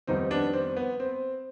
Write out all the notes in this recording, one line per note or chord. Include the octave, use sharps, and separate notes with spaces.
F2 D#3 G3 B3 C4 D#4
B3 D4
C4
B3
C4